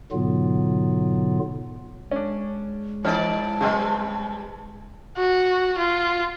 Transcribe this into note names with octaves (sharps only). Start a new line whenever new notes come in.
G#2 B2 D3 F#3 B3 F4
G#3 C#4 D4
G#1 E3 C#4 D#4 D5 A5 F6
B1 C#3 G3 C4
F#4
F4